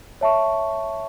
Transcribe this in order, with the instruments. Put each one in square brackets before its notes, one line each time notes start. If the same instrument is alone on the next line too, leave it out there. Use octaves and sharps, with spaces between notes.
[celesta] C#5 E5 A5 C#6